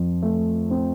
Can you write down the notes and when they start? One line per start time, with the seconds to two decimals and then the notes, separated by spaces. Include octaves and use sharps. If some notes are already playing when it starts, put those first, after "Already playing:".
Already playing: F2 F3
0.23 A3
0.70 C4